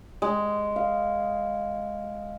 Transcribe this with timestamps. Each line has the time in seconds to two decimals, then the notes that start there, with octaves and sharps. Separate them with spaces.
0.22 G#3
0.76 F5